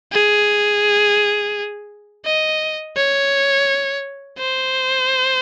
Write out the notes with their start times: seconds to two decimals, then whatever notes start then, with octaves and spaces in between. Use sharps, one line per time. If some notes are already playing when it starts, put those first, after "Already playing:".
0.13 G#4
2.25 D#5
2.96 C#5
4.39 C5